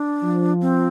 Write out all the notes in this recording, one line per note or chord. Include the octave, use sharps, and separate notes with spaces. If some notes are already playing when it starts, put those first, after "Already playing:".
Already playing: D4
F3
C4